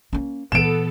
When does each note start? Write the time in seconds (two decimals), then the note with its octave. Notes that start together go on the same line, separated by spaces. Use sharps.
0.13 A#3 C#4
0.52 A#2 E3 B3 A4 D7 E7